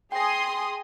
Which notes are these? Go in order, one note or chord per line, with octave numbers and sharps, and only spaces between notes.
G#4 G5 C6 D#6 A#6